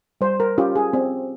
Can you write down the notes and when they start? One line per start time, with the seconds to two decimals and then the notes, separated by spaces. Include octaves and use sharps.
0.21 G3 C5
0.40 A#4
0.58 C#4 F4 G4
0.76 G#4
0.93 C4